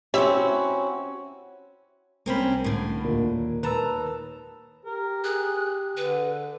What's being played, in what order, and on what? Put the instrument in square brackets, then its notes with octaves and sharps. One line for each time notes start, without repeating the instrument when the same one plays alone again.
[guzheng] C4 E4 [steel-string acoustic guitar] C#4 F#4 [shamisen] G4 C#5 E5
[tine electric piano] C2 B5 [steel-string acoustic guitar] A#3 C4 C#4
[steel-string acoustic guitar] A2 D3
[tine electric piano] D#2 A#2 [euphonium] A#4
[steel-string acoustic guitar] D#2 A#5 [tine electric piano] B4 A5 E6
[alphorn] G4 [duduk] A#4
[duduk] G#4 [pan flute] F#6
[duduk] D3 [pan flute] B4